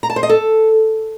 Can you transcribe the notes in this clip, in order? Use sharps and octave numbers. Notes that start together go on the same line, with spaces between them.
A#5
A5
C5
D#5
A4